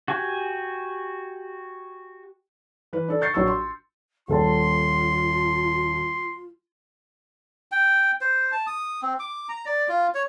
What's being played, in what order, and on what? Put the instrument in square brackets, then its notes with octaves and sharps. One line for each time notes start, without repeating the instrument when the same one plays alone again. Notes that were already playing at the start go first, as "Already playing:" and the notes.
[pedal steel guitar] F#4 G4 G#5
[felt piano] E3 B4
D4 A4
C#6 G6 A6 C7 C#7
A#1 F#3 C#6 E6
C6
[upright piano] D#1 A4 A5 [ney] F4 [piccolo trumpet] C6
[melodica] G5
C5
A5
D#6
C4
D6
A#5
D5
F4
C#5